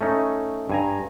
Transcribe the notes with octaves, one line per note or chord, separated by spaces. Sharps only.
A3 C#4 D#4
G2 G#5 A#5